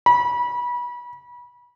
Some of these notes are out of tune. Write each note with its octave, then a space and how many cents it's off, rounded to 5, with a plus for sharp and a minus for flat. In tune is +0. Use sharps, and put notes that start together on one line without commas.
B5 -30